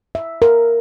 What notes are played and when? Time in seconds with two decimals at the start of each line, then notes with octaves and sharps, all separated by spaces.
0.15 E5
0.42 A#4